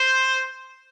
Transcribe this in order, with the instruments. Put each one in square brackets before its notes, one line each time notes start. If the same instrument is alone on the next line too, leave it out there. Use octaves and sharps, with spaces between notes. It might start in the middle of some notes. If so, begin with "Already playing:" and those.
Already playing: [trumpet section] C5